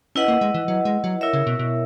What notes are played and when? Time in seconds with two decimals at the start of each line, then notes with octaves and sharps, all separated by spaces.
0.15 C#4 E4 B4 D#5 F#5
0.28 A#3
0.41 G#3
0.54 E3
0.68 F#3
0.85 G#3
1.04 F#3
1.21 E4 A#4 C#5 E5
1.33 C#3
1.47 B2
1.59 B2